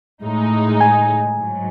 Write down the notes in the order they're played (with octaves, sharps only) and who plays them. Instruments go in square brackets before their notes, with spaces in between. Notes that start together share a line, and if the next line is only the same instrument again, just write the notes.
[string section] A2 G#3 D#4
[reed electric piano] G#5
[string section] G#2 F#3